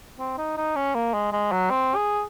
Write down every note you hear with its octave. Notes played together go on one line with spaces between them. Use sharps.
C4
D#4
D#4
C#4
A#3
G#3
G#3
F#3
C4
G#4